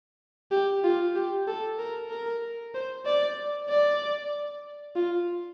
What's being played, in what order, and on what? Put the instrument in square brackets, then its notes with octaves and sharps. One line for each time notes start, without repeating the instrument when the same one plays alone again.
[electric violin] G4
F4
G4
A4
A#4
A#4
C5
D5
D5
F4